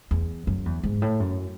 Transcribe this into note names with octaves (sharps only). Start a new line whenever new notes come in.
E2
F#2
E2
G#2
A2
F#2